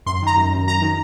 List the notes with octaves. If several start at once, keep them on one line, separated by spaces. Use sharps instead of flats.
F#2 C6
D#3 A#5
F#2
F#2
F#2 A#5
D#3